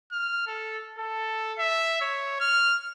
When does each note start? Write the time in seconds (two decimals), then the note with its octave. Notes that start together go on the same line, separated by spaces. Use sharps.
0.12 F6
0.47 A4
0.99 A4
1.59 E5
2.01 C#5
2.41 F6